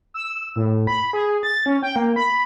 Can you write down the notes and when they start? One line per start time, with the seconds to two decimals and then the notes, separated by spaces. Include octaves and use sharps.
0.14 E6
0.56 A2
0.87 B5
1.13 G#4
1.43 A6
1.66 C#4
1.83 G5
1.96 A#3
2.16 B5